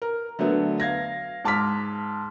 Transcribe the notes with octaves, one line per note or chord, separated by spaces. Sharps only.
A#4
D3 F#3 A3 B3
F5 G#6 A#6
G#2 A5 D6 F6 B6